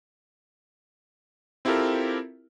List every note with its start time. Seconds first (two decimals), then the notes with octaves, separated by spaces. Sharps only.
1.65 C4 E4 F4 G4 A4 A#4